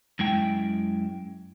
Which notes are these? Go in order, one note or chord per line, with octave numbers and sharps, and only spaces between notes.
F#2 G#3 E4 G5